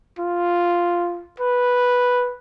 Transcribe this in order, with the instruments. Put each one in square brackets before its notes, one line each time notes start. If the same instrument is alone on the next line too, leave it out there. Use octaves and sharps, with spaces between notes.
[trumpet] F4
B4